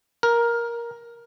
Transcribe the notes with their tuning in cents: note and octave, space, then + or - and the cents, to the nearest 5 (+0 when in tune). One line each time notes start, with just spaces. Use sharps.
A#4 +10